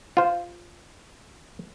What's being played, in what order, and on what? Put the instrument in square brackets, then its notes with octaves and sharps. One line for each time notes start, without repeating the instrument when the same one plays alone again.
[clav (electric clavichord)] F4 C5